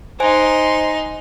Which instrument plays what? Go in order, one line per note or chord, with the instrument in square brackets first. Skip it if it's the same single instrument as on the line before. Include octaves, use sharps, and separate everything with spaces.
[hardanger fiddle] D#4 C6 [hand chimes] C5 G#5